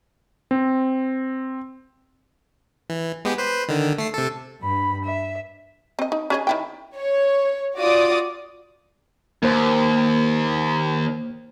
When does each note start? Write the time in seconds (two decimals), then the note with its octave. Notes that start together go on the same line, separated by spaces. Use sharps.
0.51 C4
2.90 E3
3.25 G#3 B3 G4
3.38 B4 C5
3.68 D3 D#3
3.98 A3 C7
4.14 C3 A4
4.62 G2 B5
5.04 E5
5.99 C4 D#5
6.12 D#4
6.30 C#4 G#4 D#5
6.47 D#3 E4 G5
6.95 C#5
7.77 F4 F#4 D5 D6 D#6
9.43 D#2 A#3 C5